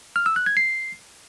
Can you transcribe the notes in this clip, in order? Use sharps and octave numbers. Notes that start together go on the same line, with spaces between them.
F6
E6
F#6
G#6
C7